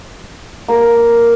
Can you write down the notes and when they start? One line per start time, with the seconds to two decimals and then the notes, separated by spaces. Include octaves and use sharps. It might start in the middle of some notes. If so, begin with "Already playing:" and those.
0.68 A#3